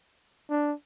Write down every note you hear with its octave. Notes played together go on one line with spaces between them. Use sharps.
D4